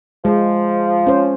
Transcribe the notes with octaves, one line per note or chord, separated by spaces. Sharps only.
F3 G#3
C#4 C5